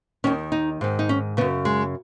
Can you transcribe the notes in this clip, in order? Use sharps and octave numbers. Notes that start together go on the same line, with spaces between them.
D#2 D#3 C#4
D#4
G#2 D#3
D#4
C#4
F#2 C#3 B3
G#3